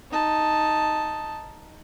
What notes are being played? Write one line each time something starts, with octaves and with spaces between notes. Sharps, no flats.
D#4 A5